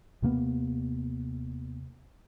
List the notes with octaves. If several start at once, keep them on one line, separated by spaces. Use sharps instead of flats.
D#2 C3 A#3 B3